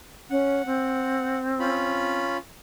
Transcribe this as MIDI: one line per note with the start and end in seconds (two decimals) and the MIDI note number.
0.30 0.62 61
0.30 1.39 78
0.66 2.21 60
1.59 2.37 61
1.59 2.37 65
1.59 2.37 83